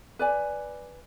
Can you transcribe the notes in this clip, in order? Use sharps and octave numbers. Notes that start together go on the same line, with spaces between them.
B4 D5 G#5